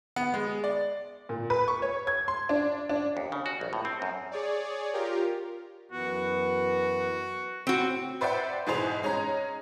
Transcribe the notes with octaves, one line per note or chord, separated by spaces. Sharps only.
B3
G#3
D5
A#2
B4
C#6
C#5
G#6
C6
D4
D4
D#2
C#3
F#4
A#1
A2
C4
F#2
G#4 C#5 D5
F4 G4 A#4
F#2 E3 B3 F#4
A2 C4 F#4
B4 C5 D5 E5 F#5 G5
G#2 B2 E3 G#4 C5 F7
G#3 C#4 D#4 A#5